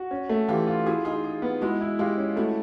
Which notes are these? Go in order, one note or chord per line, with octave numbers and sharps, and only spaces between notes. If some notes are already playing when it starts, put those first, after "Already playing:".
Already playing: F#4
C#4
A3
E3 F4 G4
F4
E4 F#4 G#4
D#4 F4 G#4
G#4
B3
G#3 E4 F#4
E4
G#3 F4 G4
C#4
A3 E4 F#4